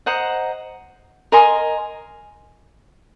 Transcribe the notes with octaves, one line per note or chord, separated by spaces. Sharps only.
C5 D#5 F#5 A#5
A#4 D#5 G#5 C6